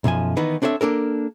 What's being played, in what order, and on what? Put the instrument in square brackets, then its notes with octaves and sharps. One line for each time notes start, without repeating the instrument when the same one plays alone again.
[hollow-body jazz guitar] B1 F#2 F3 G#5
D#3 E3 B3 D#4
C4 D4 A4 C#5 E5
A#3 D4 A4 A#4